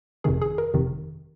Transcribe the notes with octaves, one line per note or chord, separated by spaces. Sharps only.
G1 F2 C3 D#3 G#4
G#4
A#4
G1 F2 C3 D#3